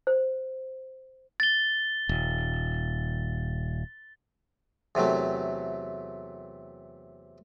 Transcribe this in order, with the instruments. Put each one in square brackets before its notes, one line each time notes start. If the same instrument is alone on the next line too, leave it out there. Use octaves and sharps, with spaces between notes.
[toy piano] C5
[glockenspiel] A6 G7
[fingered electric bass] D#1
[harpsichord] E2 C3 F#3 A3